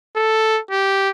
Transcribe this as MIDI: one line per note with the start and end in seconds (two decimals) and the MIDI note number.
0.16 0.59 69
0.71 1.09 67